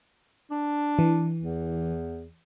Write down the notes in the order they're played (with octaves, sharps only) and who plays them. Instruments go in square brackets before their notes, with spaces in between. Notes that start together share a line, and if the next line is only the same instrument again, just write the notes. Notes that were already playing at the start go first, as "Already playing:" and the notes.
[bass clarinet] D4
[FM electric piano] E3
[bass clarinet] E2